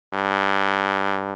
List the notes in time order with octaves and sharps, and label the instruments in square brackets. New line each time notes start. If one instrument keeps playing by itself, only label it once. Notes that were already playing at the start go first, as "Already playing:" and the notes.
[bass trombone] G2